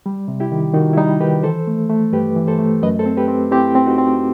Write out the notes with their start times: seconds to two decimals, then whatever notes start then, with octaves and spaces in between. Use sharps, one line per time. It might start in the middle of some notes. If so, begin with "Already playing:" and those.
0.06 G3
0.28 C3
0.40 E4 G4
0.52 D#3
0.74 D#3 D#4 F#4
0.93 E4
0.97 G3 D#4
1.20 D#3 G4 B4
1.43 E3 A4 C5
1.67 A3
1.89 A3
2.13 G2 G4 B4
2.36 E3
2.47 A4 C5
2.59 A3
2.82 F#2 B4 D#5
2.99 A4 C5
3.06 C4
3.17 G4 B4
3.28 C4
3.51 C4 E4 G4
3.75 C4
3.86 D#4 F#4
3.98 C4